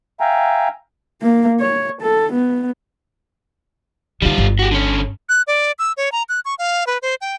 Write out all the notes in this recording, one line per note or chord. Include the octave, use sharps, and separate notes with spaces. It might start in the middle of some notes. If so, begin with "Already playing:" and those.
E5 F5 G5 G#5 A#5
A#3
C#5
A4
B3
D3 G3 D#4 F4
G1
F#4 G4
D3 C#4
F#6
D5
E6
C#5
A#5
F#6
C#6
F5
B4
C5
G5